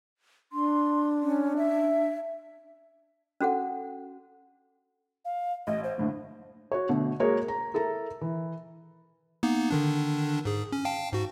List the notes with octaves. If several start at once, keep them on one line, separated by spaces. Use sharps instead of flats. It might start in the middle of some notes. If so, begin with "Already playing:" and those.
D4 C6
C#4
E5
C#4 F#4 A4 F#5
F5
A1 D#5
C5
F#1 A2 D3
F#4 C#5
B2 D3 A3
G#3 A#3 F#4 G#4 A#4 C#5
A#5
E4 A4 A#4 A#5
E3
A#3 B3 D#4
D3 D#3 D4
G#2 G#4
C#4
F5 G5 A5
G#2 F#4